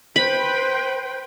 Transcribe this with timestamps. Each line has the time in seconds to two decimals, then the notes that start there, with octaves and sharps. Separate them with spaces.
0.16 B4 C5 G5 B5